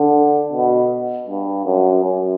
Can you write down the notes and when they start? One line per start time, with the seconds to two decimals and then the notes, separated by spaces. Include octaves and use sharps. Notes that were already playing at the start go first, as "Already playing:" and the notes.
Already playing: D3
0.52 B2
1.28 G2
1.65 F#2
2.04 F#2